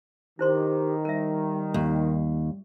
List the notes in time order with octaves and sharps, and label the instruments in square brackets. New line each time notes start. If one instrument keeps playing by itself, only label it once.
[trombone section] D#3 [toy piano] E4 C5 C6 [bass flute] G4
[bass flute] G3 [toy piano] A#4 E5
[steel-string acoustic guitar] D#2